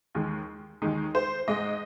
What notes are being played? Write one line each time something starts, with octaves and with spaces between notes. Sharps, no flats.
D#2 D#3 G#3
D#2 D#3 G#3 D#4
C5
G#2 G#3 D#5